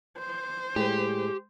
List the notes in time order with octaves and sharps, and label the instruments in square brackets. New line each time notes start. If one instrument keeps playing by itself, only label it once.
[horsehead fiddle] C5
[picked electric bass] A2 [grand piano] G#3 [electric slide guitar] G4